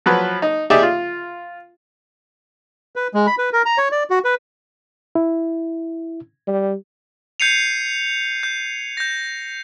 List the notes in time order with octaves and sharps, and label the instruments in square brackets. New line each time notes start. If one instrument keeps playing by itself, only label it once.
[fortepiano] F3 F#3 B4
D#4
D#4 G4 G#4 D5 E5
F4
[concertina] B4
G#3
B5
B4
A#4
A#5
C#5
D5
F#4
B4
[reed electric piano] E4
[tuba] G3
[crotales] G6 G#6 C7 C#7 D#7 F7
G6
G6 A#6